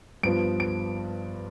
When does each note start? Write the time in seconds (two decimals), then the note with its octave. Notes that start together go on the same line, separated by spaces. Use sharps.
0.23 G2 F3 B3 D7
0.60 D7